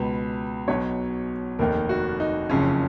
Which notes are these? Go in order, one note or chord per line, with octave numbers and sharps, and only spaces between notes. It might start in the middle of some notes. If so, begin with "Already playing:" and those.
Already playing: C#2 B2 B4
B1 B2 C#5
F1 D#2 D#3 A#4
F#4
D#4
F#1 F2 C#3 C#4